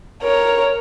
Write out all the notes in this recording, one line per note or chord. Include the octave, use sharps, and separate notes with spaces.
A#4 C#5